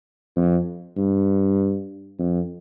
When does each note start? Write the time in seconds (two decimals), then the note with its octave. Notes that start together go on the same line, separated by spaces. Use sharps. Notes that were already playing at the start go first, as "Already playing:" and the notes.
0.36 F2
0.97 G2
2.19 F2